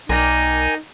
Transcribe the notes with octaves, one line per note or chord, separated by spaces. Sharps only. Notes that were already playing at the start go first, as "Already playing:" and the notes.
B1 D#4 A#4 D5 G5 G#5